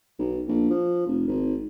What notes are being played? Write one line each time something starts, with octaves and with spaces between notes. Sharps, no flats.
B1
A#1
F3
F1
G#1